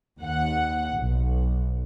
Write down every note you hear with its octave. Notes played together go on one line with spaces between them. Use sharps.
D#2 F#5
B1